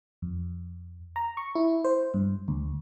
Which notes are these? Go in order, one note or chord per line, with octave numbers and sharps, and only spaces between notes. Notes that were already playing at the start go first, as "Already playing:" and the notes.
F2
A#5
C#6
E4
C5
G2
D2